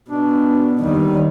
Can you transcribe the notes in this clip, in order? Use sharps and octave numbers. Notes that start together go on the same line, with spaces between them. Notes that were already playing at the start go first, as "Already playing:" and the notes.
B2 D4
D#2 D#3 G3